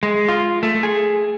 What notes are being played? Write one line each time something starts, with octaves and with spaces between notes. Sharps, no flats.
G#3
F4
A3
G#4